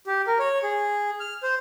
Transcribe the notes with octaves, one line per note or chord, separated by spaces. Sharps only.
G4
A#4
C#5
G#4
F6
C5